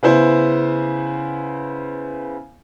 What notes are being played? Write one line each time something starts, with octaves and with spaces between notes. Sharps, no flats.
C#3 B3 E4 C5